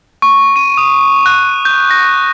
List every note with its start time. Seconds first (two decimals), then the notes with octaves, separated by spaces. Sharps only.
0.22 C#6
0.56 D#7
0.77 D#6
1.26 F#6
1.65 G6
1.91 A#6